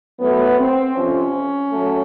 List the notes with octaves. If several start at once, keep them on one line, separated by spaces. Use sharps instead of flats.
A2 F#3 A3 B3
C4
F2 C3 F3 C#4
F#3 A3